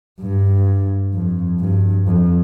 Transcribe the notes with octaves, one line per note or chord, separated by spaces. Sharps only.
G2
F2
G2
F2